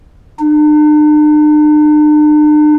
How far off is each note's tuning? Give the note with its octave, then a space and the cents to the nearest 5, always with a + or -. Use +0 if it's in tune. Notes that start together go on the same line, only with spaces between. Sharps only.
D4 +45